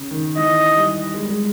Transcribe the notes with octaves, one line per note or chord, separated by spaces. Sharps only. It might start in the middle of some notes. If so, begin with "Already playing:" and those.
Already playing: C#3
D#3
E3 D#5
G3
G#3
G3
G#3